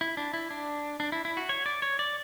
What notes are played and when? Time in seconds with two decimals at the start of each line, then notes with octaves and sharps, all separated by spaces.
0.01 E4
0.17 D4
0.34 E4
0.51 D4
1.00 D4
1.12 E4
1.25 E4
1.37 F#4
1.49 C#5
1.66 D5
1.82 C#5
1.99 D5